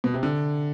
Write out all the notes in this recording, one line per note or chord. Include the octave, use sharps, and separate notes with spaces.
B2
C3
D3